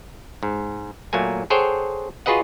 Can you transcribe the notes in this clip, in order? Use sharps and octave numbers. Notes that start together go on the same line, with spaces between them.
G#2
A#2 F#3 A3 A#3 G#5
G#4 A4 C5 C#5 F#5 G5
F4 F#4 G#4 B4 D#5 F#5